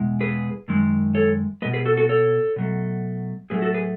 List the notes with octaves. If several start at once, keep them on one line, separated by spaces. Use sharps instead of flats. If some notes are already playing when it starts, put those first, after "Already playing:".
Already playing: E2 B2 G#3
G#4 B4
F#2 D#3 G#3
A4 C#5
G#3 B4 D#5
B2
G#4 B4
F#4 A4
F#4 A4
A4 C#5
B2 F#3 A3
A2 F#3 A3 G#4 B4
F#4 A4
G#4 B4